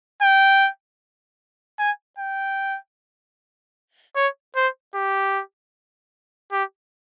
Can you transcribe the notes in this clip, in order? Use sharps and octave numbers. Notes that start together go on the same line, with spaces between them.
G5
G#5
G5
C#5
C5
G4
G4